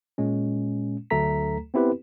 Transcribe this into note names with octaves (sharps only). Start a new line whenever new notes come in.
A#2 G#3 C#4
D2 F#3 A3 A4 A#5 B6
B3 C4 E4 G4 B4